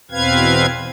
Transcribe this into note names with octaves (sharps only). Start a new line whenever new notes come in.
E2 B2 C4 B4 F5 G#6